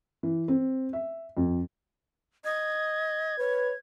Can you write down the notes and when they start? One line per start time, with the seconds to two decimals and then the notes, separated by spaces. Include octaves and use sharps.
0.23 E3
0.48 C4
0.93 E5
1.37 F2
2.44 D#5 G#6
3.39 B4 C#5